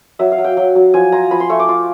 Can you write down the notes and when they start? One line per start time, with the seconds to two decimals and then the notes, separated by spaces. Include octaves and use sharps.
0.19 F#3 E5
0.32 F5
0.38 F#3
0.44 G5
0.57 F#3
0.75 F#3
0.94 F3 G#5
1.12 F4 A#5
1.31 F3 B5
1.40 C6
1.50 A3 C#6
1.59 D6
1.69 F4